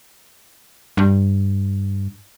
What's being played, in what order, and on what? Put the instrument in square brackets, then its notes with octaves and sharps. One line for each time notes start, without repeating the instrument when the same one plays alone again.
[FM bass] G2